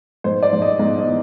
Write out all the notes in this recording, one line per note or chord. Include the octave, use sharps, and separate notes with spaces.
G#2 C5
D5
G#2
D#5
G#2 D#5
D#5
E3